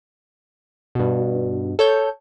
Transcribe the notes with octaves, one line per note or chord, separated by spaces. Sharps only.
G2 B2
A4 C#5 G6